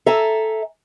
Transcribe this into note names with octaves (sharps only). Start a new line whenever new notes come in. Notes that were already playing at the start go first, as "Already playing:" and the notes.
A4 E5 G#5 A#5